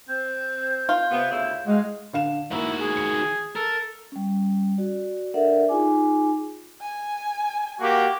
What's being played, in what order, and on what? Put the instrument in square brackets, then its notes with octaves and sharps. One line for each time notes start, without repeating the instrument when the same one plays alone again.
[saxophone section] C4 [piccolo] G6
[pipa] F4
[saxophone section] C3 B3
D2 C#3 E4
[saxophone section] A2 F#4 F5 [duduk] G#3
[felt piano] D3 F5 E7
[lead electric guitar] D#3 F#4 [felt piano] A#3 A#5 [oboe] E4
[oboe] G#4
[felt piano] C#7
[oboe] A4 [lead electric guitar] A#4
[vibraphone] G3 C#4
F#4 D5
D4 A4 A#4 D5 E5 F#5
D#4 F4 G#4 G#5 D6
[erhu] G#5
[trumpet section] A#3 F#4 G4